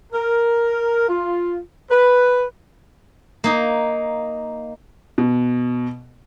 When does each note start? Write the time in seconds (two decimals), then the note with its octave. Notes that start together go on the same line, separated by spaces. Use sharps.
0.13 A#4
1.09 F4
1.90 B4
3.44 A#3 D#4
5.18 B2